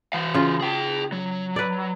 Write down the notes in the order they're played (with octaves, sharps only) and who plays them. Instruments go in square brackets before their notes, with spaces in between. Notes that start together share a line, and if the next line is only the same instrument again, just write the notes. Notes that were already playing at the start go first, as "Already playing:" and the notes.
[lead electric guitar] E3 F5
[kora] C#3 F4
[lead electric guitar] G#4 G5
F#3
[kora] B4 D5